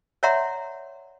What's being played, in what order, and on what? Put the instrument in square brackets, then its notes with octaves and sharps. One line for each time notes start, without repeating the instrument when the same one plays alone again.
[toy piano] C#5 D5 E5 F#5 A#5 C6